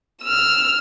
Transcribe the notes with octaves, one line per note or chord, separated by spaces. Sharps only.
E6 F6